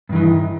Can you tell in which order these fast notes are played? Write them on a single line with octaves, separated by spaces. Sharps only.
G2 D#3 E3